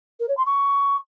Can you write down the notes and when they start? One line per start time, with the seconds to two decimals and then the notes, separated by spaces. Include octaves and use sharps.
0.20 A#4
0.28 C#5
0.37 C6
0.46 C#6